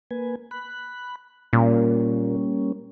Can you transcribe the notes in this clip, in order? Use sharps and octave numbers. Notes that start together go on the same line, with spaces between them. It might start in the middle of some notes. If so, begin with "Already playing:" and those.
A#3 B4 G#5
B5 F#6
A#2 G3 A#3 C#4